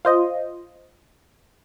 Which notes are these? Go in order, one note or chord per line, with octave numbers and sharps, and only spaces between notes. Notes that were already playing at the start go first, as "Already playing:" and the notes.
F4 C5 D#5